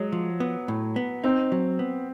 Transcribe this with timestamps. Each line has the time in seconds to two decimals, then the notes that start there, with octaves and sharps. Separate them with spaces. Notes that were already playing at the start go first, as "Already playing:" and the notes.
Already playing: F#3 G#3
0.12 F3
0.40 B3
0.68 A2
0.96 B3
1.24 C4 D#4
1.52 F#3
1.79 B3